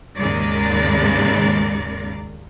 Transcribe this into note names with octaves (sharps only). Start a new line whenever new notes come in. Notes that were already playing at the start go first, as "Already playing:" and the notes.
D#2 G#2 C#3 G#3 A#4 D5